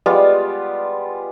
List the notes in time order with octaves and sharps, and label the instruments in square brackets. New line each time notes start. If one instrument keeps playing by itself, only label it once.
[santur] G3 G#3 B3 F4